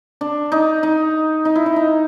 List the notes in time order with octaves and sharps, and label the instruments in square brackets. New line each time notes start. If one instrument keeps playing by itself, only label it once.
[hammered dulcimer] D4
D#4
D#4
D#4
E4
D#4
D#4